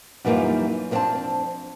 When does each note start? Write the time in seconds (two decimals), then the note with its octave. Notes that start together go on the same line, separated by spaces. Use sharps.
0.25 F#2 E3 G3 A#3 D#4 F4
0.91 F2 A#3 C4 D4 C5 A5